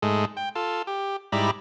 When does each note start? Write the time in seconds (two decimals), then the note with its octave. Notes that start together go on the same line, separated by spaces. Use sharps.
0.02 G#2 G#3 A3
0.37 G5
0.55 F4 A4
0.87 G4
1.32 G#2 G3 E4 D5 A#5 B5